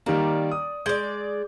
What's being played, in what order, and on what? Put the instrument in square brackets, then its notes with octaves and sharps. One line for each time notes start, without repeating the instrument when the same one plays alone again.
[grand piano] D#3 G3 A#3 [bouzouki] D5
[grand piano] D#6
[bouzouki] G#3 D5 [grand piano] G6